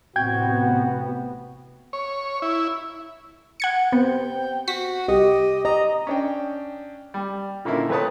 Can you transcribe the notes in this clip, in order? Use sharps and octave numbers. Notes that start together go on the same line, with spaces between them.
A1 C3 B3 C4 F#4 G5 G6 G#6
C#5
E4
F#5 G#6 C#7
B3 C4 G5
F#4 B6
C2 G4 D#5
D#5 A#5
C#4 D4 G5
G3
A#2 D3 A#3 C#4 D#4 E4
F2 A3 B4 C#5 A5 D#6